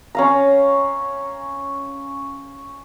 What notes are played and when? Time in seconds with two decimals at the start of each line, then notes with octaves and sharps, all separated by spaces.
0.15 C#4 F5 A#5